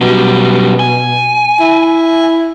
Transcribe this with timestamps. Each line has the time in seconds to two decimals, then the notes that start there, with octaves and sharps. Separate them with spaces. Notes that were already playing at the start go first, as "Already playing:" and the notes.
0.01 F#2 B2 G3
0.79 G#5
1.60 E4